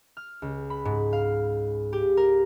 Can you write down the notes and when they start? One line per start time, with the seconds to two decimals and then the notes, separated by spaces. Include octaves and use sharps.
0.17 F6
0.42 C#2
0.70 B5
0.85 G#2
1.13 F5
1.93 G4
2.17 A#4